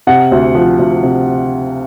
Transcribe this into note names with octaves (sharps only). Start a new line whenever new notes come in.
C3 F#5
D2
F3
D2
C3